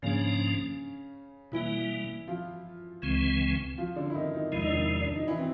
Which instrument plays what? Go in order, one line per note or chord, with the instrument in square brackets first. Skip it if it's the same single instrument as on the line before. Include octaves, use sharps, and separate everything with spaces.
[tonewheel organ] G#2 F3 A#3 D4 [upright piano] C#3 C#4
[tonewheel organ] B2 G3 A#3 [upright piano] E3 E4
[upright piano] F3 F4
[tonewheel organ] C#2 C#3 E3 G#3 C4
[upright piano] F3 F4
D3 D4
E4
D#3 D#4
D#3 D#4
[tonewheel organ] E2 C3 F3 G#3 [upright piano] E4
[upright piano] D#4
D4
D#3 D#4
D4
D#4
E3 E4
C4